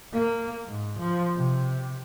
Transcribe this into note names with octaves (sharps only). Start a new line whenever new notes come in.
A#3
G#2
F3
C3